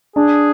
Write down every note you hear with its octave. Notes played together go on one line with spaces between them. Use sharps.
D4 G#4